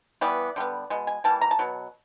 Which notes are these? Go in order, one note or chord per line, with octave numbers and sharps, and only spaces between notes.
E3 G3 B3 D5
D3 G3 B3
B2 G#3
G#5
E3 G3 A#3 A5
A#5
A5
B2 F#3